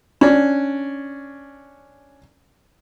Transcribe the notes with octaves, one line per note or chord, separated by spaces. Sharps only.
C#4 D4